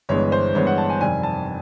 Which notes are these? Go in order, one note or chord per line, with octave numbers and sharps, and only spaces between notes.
G1 G2 E3 G#3 B3 C#5
C5
G1 G2 E3 G#3 B3 C#5
F#5
A5
G#5
F2 C3 D#3 G3 G#5
A5